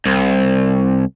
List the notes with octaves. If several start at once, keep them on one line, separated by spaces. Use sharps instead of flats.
C2